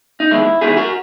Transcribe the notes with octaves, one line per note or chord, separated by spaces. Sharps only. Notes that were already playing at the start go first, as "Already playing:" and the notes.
D#4
E2 D#3 G#3 E4
E2 D#3 G#3 E4 G#4
F#4 A#4